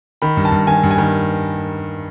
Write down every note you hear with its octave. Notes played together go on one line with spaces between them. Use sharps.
D#3 B5
G2
A5
G2
D#3 G#5
G2
G#5
D#3